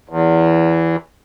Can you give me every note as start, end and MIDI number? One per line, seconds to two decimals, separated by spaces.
0.09 0.96 40